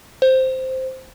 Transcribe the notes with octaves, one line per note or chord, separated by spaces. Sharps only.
C5